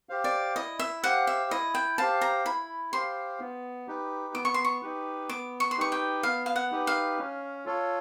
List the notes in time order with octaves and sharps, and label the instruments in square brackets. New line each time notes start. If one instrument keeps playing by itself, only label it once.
[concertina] G4 C5 F5
[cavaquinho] D5
[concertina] E4 [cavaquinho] D#5
[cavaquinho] E5
[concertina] G4 C5 F5 [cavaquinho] F#5
[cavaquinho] E5
[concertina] E4 [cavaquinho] D#5
[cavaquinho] G5
[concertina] G4 C5 F5 [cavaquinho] A5
[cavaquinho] A#5
[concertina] E4 [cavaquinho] B5
[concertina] G4 C5 F5 [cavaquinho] C6
[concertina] B3
D#4 G4 B4
[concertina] B3 [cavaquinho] D6
[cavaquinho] C#6
C6
C#6
[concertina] D#4 G4 B4
[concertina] B3 [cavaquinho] D6
[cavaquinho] C#6
C6
[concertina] D#4 G4 B4 [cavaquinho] C#6
[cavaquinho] G5
[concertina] B3 [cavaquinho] F5
[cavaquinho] F5
F#5
[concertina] D#4 G4 B4
[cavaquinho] F5
[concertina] C#4
F4 A4 C#5